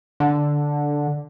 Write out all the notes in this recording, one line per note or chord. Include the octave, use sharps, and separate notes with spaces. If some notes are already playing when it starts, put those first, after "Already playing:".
D3